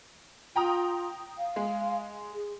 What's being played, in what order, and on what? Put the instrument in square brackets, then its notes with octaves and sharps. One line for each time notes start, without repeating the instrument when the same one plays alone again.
[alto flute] F4 [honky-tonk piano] G5 A#5 D#6
[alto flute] F5
[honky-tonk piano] G#3
[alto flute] G#4